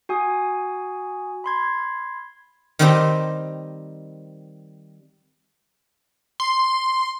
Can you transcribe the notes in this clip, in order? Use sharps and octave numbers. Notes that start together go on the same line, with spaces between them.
F#4 G#5 D#6
B5 C6 G#6
D#3 G3 C4 D#4 G4 D#5
C6